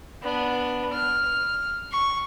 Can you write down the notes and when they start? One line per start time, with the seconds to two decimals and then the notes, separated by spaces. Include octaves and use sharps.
0.22 B3 D4
0.93 F6
1.91 C#6